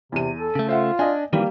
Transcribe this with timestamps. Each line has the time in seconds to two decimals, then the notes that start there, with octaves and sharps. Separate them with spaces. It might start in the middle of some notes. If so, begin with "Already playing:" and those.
0.12 E2 C3 D#7
0.39 A4
0.55 C#3 A3
0.69 F4 C5 E5 F#5
0.99 D4 D5 D#5 G#5
1.33 D#3 E3 F#3 G3 A#3 G4